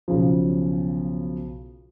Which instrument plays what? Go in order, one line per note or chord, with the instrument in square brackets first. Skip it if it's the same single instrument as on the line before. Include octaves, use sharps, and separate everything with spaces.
[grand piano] B1 C#3 F3